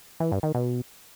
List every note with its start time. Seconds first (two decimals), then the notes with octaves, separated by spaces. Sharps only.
0.20 E3
0.32 G2
0.43 D#3
0.55 B2